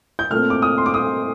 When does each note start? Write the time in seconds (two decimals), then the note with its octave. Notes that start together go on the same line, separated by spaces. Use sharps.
0.19 G6
0.30 A#2 A3 C4 F6
0.50 D6
0.62 D#6
0.78 C6
0.86 D6
0.94 D#6